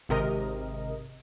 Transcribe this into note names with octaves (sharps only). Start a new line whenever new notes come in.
G#1 C3 A#4 D#5